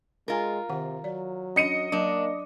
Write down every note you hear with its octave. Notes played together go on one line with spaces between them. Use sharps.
G#3 F4 A#4 G#5 A#5
C3 D#3 F#5
F#3 D5
C#4 D4 D#5 C#7 D#7
F#3 A#3 D4 A#4